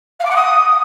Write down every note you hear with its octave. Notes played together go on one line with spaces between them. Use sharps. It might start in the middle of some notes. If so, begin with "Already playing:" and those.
F5
D6
F#5
D#6